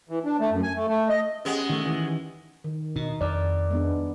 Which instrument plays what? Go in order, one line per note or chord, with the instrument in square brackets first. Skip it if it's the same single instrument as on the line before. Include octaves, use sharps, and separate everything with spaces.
[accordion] E3
D4
A3
F#2
G#5
A3
A3
D#5
[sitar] G#3 B3 [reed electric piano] C#4 G4 F#5
[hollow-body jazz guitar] D#3 A3
D#3 E3
[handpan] D#3
[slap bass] B2 [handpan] D#4
[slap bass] F2 [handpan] D5
[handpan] G#3 B3 D4